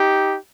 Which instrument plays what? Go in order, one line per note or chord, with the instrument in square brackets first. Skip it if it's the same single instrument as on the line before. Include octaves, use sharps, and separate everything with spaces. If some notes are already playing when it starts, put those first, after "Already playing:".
Already playing: [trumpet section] D#4 G4